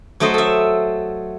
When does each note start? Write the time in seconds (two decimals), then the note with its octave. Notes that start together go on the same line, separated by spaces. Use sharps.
0.20 F#3 A3 C5 D#5
0.34 A4 E5